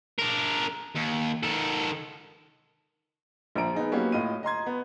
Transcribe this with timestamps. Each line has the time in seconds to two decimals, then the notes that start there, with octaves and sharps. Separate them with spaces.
0.19 D4 A#4
0.95 D#2
1.43 D#3 A4
3.56 A#1 F3 A#5 D7
3.74 B3 D#4 G#4
3.92 F#3 A#3 B3 C#4 G4
4.12 A2 F4 D#5 D#7
4.43 D#5 A#5 C6 G#6
4.66 B3